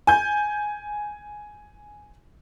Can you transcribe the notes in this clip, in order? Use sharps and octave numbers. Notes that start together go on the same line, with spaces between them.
G#5 G6